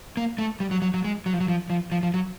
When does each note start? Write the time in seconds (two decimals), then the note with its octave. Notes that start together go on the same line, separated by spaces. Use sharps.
0.17 A#3
0.38 A3
0.60 G3
0.71 F#3
0.82 F#3
0.94 F#3
1.04 G#3
1.26 F#3
1.33 F3
1.40 F#3
1.48 F3
1.70 F3
1.92 F3
2.03 F3
2.14 F#3